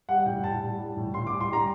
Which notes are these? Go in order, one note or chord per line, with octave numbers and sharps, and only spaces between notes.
G3 F#5
A2 G5
A2 A5
G3
G3
A2
A2 C6
D6
G3
C6
G3 A#5